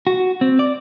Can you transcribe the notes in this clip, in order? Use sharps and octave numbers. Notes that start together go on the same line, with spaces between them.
F#4
C4
D5